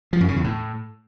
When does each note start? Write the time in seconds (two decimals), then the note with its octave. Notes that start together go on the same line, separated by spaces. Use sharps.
0.13 F3
0.21 F#2
0.28 C#3
0.36 E2
0.44 A2